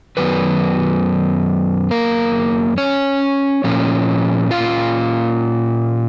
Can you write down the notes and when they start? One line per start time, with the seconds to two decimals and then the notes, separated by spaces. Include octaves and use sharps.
0.17 F#2 D#3 F#3 B3 B4
1.91 A#3 A#4
2.78 C#4 C#5
3.64 A#2 F3 A#3 C#4
4.51 F4 F5